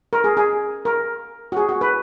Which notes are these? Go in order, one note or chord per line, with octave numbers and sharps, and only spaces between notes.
A#4
G#4
G#4
A#4
F#4
G#4
F#4
B4